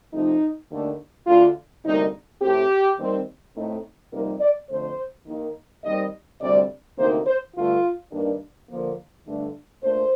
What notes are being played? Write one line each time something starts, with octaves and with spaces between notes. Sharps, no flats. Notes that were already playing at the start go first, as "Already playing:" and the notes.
C3 F3 A3 D#4
D#2 D3 A3 D4
D2 D3 A3 F4
D2 C3 G3 A#3 D#4
A2 A3 C4 G4
D#2 D#3 G3 C4
A2 A3 C4 D#4
F2 C3 G3 A#3 D#4 A#4
D5
F2 D3 A3 C5
D#2 D#3 A#3 D#4
D#2 D#3 G3 C4 D#5
D2 C3 G3 C4 D5
D2 C3 D#3 A#3 D#4 C5
C5
G2 D3 A3 F4
G2 D#3 A#3 D4
D3 F3 A#3
G2 D3 A3 D4
A#2 A3 D4 C5